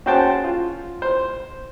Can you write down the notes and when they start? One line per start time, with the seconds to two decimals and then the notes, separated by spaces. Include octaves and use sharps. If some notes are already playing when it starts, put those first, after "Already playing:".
0.06 C#4 F#4 G#4 C5 G5 A5
0.44 F4
1.02 C5